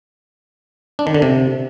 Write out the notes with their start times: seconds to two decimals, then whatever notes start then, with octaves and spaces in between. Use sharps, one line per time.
0.99 D4
1.07 D#3
1.14 D3
1.22 C3